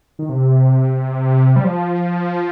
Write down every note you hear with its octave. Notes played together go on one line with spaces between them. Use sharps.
D#3
C3
G3
F3